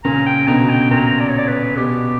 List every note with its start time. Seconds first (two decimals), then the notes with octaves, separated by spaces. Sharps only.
0.04 A#2 C#3 A#5
0.26 G5
0.48 B2 D3 A#5
0.69 G5
0.91 A#2 A#5
1.20 D5
1.29 C#5
1.38 D5
1.48 B4
1.77 B2 G4